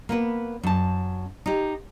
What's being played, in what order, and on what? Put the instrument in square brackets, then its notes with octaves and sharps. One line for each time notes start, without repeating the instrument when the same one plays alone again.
[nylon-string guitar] A#3 B3 B4
F#2 A5
D#4 G4